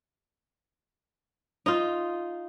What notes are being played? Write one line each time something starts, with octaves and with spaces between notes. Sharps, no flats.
D#4 F4